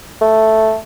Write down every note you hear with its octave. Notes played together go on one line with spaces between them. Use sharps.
A3